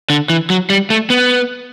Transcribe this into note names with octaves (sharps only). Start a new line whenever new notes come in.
D3
E3
F#3
G3
A3
B3